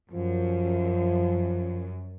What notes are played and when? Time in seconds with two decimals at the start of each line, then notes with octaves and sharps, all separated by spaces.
0.11 F#2 F3